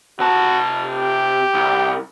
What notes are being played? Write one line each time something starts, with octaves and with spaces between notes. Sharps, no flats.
C3 F#4 A5
G4
C2